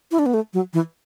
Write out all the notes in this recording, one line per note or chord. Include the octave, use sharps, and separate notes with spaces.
E4
D4
B3
A3
F#3
E3